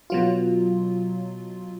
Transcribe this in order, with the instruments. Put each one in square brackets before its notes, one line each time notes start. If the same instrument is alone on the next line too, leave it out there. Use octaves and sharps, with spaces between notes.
[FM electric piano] B2 F#3 F4